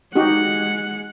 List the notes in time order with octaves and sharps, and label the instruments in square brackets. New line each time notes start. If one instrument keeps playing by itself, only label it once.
[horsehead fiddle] G#3 F#5 [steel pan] D#4 F#4 G4